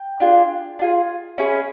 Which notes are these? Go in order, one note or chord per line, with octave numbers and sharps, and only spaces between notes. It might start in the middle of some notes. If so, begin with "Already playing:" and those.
Already playing: G5
D4 F4 G#4
D4 F4 G#4
C#4 E4 G#4